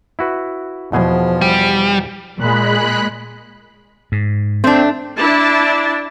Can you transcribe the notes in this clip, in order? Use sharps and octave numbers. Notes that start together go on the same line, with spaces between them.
E4 F#4 B4
E2 B2 F3 G#4
G3
A#2 G#3 B5 F#6
G#2
A3 C4 D4
D4 E4 A5